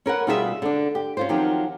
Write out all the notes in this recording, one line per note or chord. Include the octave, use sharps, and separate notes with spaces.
C#4 A#4 B4 F#5
B2 G3 F4 G#4 A4 E5
D3 D4
G4
C#4 F4 C5
D#3 F3 F#3 C4 G4